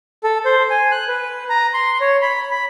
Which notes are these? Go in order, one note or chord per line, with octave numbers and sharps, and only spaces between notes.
A4
C5
G#5
F#6
B4
A#5
C6
C#5
B5
B5